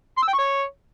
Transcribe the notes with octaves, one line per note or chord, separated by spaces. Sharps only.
C6
E6
G5
C#6
C#5